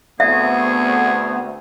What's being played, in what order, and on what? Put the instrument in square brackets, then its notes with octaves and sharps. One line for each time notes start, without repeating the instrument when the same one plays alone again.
[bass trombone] D2 [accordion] A3 B3 C4 [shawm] G#4 [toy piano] E5